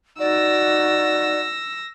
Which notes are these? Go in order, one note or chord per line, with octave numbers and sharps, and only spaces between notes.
D#4 F#4 D5 E6 A#6